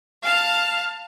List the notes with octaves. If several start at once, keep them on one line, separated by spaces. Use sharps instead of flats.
F5 A5 F6